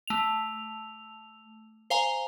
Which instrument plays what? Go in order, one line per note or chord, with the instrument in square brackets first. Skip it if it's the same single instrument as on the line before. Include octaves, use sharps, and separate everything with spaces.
[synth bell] A3 F7
C5 F5 G#5 A#5